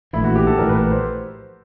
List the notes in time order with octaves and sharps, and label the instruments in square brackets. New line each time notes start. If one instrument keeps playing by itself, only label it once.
[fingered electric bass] A#1 A2 E3 [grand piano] E4
[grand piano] F#4
G4
A4
[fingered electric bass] A#1 A2 E3 [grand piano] A#4
[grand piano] B4
B4
C5